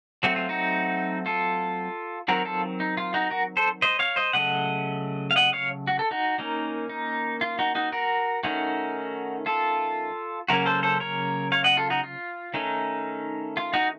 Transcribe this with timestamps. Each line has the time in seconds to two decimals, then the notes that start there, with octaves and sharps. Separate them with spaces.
0.23 F#3 A3 C4 F#4
0.36 F4
0.49 D#4 F#4
1.26 F4 A4
2.28 D#3 F#3 C4 F#4 A#4
2.45 F4 A4
2.80 D#4
2.97 F4
3.14 D#4 F#4
3.30 F#4 A#4
3.57 A4 C5
3.82 C5 D#5
3.99 C#5 F5
4.16 C5 D#5
4.33 C#3 F#3 A3 D#5 F#5
5.31 F5
5.36 D#5 F#5
5.53 C#5 F5
5.87 F#4
5.99 A4
6.11 D#4 F#4
6.38 D#3 A#3 C#4 D#4
6.89 D#4
7.41 F4
7.59 D#4 F#4
7.75 D#4 F#4
7.92 F#4 A#4
8.43 D#3 A3 C#4 D#4 F#4
9.46 F4 A4
10.48 C#3 F#3 A#3 C#4 F#4 A#4
10.66 A4 C5
10.83 A4 C5
11.00 A#4 C#5
11.52 C#5 F5
11.64 D#5 F#5
11.77 F4 A4
11.90 D#4 F#4
12.03 F4
12.54 D#3 A3 C#4 D#4
13.57 F4
13.73 D#4 F#4